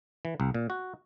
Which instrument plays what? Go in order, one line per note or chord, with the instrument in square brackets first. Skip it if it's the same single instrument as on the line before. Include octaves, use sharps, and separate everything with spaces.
[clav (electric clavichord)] E3
C2
A#2
F#4